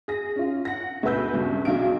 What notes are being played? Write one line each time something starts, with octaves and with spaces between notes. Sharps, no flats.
G#4 A#6
C#4 F4
F#5 A#6
D2 B2 B4 E6 G6
C2 G2 C#3
B1 F#3 D4 F5 D7